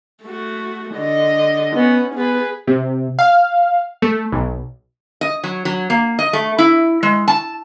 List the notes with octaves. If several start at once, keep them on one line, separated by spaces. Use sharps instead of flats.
A3 F#4
D3 D#5
B3 C#4
B3 G#4 B4
C3
F5
A3
B1
D#5
F#3
F#3
A#3
D#5
A3
E4
G#3
A5